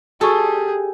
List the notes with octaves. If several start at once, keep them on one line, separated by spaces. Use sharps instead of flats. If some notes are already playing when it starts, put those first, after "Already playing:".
G3 F#4 G#4 A4 C#6